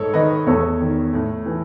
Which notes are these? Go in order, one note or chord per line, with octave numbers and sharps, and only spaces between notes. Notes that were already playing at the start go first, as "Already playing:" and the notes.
Already playing: G#2 A4 C#5
D#3 B4 D#5
E2 A4 C#5
D#3
A2
E3